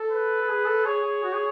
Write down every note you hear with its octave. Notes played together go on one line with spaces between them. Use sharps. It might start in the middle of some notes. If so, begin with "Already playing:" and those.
Already playing: A4
B4
A4
G#4
A4
G#4 C#5
G#4
F#4
G#4